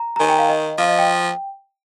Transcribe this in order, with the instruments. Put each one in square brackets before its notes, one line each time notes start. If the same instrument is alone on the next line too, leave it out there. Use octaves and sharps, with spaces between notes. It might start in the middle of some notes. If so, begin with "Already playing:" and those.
Already playing: [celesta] A#5
A#5
[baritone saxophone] D#3 [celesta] G#5
[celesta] G5
F5
D#5
[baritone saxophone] F3 [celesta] F5
[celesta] D#5
G5